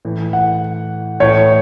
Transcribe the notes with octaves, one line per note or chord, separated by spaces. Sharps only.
A2 E3
F#5
A2 E3 C#5